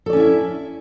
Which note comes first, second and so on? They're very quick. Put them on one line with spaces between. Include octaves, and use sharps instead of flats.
A4 D5 C#4 E4 E5